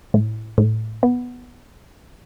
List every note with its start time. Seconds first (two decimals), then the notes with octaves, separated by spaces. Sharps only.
0.14 A2
0.58 A2
1.03 B3